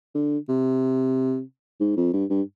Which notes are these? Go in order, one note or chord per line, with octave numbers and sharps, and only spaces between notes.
D3
C3
G#2
F2
G2
G2